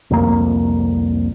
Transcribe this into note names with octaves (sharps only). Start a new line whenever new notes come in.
C2 F2 A#3